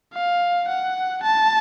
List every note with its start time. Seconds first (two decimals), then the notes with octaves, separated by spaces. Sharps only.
0.14 F5
0.68 F#5
1.23 A5